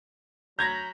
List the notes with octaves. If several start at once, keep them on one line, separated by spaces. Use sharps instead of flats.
F#3 A#5 B5 G6 G#6 A#6